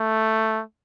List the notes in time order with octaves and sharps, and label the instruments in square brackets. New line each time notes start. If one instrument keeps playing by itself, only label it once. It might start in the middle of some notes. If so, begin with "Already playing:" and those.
Already playing: [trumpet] A3